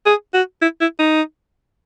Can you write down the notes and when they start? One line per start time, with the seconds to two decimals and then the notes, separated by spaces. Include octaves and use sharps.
0.06 G#4
0.33 F#4
0.61 E4
0.81 E4
0.99 D#4